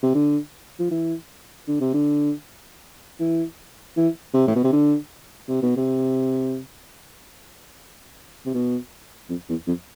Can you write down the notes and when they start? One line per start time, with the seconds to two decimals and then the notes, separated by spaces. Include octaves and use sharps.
0.03 C3
0.15 D3
0.79 F3
0.91 E3
1.68 D3
1.81 C3
1.94 D3
3.20 E3
3.97 E3
4.34 C3
4.47 A2
4.55 B2
4.64 C3
4.73 D3
5.48 C3
5.62 B2
5.77 C3
8.46 C3
8.54 B2
9.30 F2
9.49 E2
9.67 F2